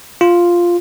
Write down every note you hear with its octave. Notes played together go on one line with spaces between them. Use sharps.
F4